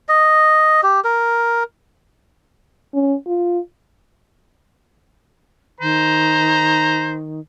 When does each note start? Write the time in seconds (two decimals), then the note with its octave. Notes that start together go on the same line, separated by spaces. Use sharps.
0.09 D#5
0.83 G4
1.04 A#4
2.94 C#4
3.27 F4
5.81 D#3 C5 A#5